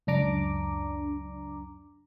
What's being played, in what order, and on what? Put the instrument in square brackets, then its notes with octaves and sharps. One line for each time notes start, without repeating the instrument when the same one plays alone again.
[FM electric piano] C#2 F#2 D4 A#5 D6